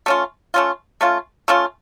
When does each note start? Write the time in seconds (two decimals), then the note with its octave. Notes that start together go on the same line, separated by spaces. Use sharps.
0.06 A3 C#4 F4
0.54 A3 C#4 F4
1.01 A3 C#4 F4
1.48 A3 C#4 F4